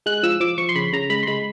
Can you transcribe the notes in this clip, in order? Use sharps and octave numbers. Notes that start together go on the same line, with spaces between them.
G#3 F#6
F3 E6
F3 D6
F3 C#6
C6
C#3 B5
C#3 A#5
G#3 B5
C6
G#3 B5